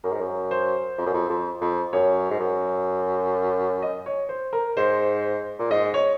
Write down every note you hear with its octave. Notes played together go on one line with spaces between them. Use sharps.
F#2 A#4
G#2
F#2
C5
F2
F#2
F2
F2
F2
F#2 C#5
G#2
F#2
D#5
C#5
C5
A#4
G#2 C5
A#2
G#2 D#5
C#5